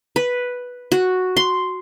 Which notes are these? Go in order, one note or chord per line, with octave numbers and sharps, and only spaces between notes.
B4
F#4
C6